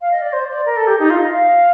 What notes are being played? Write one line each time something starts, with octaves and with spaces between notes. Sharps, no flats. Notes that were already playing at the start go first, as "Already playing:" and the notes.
F5
D#5
D5
C5
D5
A#4
A4
G4
D#4
F4
D#5
F5